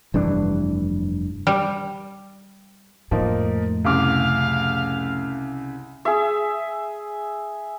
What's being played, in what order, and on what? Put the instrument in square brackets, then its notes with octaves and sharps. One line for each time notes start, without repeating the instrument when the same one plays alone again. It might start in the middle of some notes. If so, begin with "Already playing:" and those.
[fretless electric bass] F1 G2 E3 D4
[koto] G3
[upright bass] F2 A2 [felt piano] F3 A#3 D#4
[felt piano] C2 C#3 D6 [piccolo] F5
[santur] G#4 E5